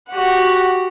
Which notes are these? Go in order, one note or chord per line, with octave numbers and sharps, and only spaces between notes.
F#4 G4 F#5